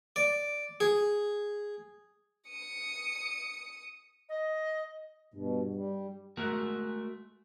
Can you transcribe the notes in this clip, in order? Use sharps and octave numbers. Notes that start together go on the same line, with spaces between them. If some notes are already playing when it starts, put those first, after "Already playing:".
D5
G#4
D#6 C#7
D#5
G2 B2
G3
G#3 A3 F#4 A#4